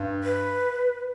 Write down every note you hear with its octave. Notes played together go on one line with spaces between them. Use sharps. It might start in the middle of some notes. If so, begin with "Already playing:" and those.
Already playing: G2
B4